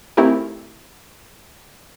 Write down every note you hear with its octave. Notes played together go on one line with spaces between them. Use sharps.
A3 C4 D#4 E4 G4 A#4